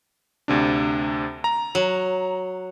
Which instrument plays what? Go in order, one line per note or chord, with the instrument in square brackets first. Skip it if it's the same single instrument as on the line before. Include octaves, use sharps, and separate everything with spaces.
[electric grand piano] D2 C3 D4
A#5
[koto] F#3